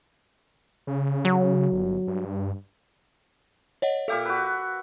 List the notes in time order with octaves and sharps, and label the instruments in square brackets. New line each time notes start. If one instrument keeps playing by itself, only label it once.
[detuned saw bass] C#3
[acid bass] F#3
[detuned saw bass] G1
G2
[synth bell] C#5 D#5 F#5
[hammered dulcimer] A#2 G4 E5 [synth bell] A4 F5
[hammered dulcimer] F#4 B4